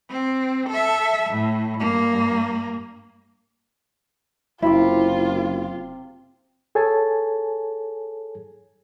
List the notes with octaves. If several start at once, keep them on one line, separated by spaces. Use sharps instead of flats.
C4
A4 E5
A2
G2 A#3
F#1 C3 E4 F4 D6
G#4 A4 C#5 G#5 A5